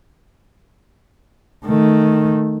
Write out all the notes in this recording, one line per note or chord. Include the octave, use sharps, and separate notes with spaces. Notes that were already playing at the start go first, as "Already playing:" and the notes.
D#3 A3